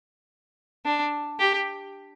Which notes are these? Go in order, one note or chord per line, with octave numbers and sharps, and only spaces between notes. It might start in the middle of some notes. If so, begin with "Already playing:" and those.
D4
G4